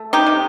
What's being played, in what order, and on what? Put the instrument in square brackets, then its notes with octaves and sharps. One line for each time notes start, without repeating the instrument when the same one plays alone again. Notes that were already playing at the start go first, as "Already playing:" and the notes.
Already playing: [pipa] A3
D#4 G4
C3